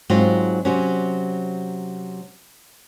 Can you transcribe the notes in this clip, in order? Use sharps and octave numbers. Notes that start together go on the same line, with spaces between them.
G#2 F#3 C4 F4
C3 F#3 C#4